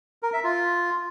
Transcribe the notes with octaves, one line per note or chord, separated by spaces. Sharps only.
A#4
E5
F4